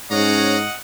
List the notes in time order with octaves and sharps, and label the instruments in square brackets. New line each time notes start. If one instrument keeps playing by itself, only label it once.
[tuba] G#2 [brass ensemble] C#4 C#5 [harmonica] D#5 F#5 [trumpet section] F5 A#5